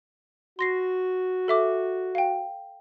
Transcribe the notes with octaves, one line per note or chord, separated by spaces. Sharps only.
F#4 C6 A#6 C7
A4 E5 D6
F5 G5